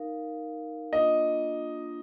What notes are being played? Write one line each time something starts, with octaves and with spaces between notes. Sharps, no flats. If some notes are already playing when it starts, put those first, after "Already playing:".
Already playing: D#4 A#4 F5
A#3 D4 F4 D#5